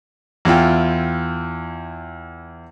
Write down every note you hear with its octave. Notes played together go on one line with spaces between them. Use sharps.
E2 E4 F4 G5